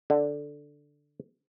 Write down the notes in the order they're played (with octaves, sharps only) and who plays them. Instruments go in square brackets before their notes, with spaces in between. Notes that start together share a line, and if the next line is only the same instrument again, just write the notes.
[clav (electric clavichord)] D3